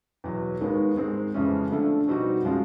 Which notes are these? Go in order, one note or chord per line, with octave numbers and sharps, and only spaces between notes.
E2 B2 F#3
D#2 D#3 G#3 B3
G#2 D#3 G#3 C4
F2 C#3 E3 G#3 C#4
D3 F3 A3 D4
B2 G3 C4 D#4 F#4
C#3 F3 G#3 C#4 F4